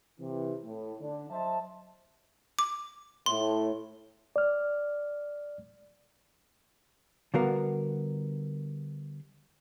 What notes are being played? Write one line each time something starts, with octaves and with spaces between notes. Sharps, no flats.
C3 E3
A2
D3 D4
F#3 C5 D#5 E5 A5
D6
A2 C6
D5 F6
D3 G3 B3 F#4 A#4 F5